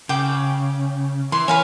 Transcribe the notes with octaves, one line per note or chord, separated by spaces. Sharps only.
C#3 G5 D6
E3 C6
B4 C#5 F5 G#5